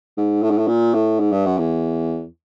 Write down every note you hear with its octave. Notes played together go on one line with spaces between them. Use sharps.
G#2
A2
G#2
A2
A#2
A2
G#2
G2
F#2
E2